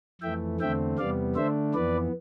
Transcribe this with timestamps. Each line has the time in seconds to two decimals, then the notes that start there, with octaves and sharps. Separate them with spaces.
0.21 F2 E3 A3 E5 G5
0.60 E2 D3 A3 C4 E5 G5
0.98 E2 C3 G3 B3 D5 F5
1.36 D3 A3 D4 C5 E5
1.74 F2 E3 B3 B4 D5